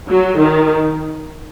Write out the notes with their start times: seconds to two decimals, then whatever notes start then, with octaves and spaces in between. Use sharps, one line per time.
0.09 F#3
0.40 D#3